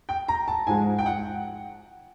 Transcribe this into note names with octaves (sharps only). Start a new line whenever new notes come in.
G5
A#5
A5
G#2 F3 G#3 G#5
G5
F#5